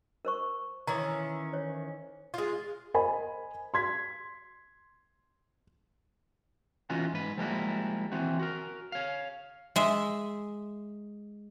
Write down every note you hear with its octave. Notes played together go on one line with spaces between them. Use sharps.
A#4 C5 C#6
D#3 E3 C#4 A#5
C5 C#5
G#3 F4
A#4 C5 D#5 G#5 B5
C6 G#6 B6
E3 B3 C#4 D#4 F4 F#4
G#2 B4
F3 G3 G#3 A#3 E4 F#4
E3 C4 F#4
F#4 A#4
C#5 F5
G#3 E5